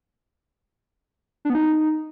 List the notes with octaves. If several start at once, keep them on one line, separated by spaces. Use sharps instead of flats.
D4
B3
D#4